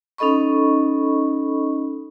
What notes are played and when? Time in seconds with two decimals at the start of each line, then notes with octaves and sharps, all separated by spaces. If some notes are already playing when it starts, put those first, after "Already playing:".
0.18 C#4 D#4 A4 D#5 B5 C#6